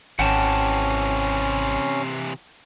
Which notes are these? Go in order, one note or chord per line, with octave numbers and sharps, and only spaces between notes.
G#1 C3 E3 C#4 F#5 G5 A5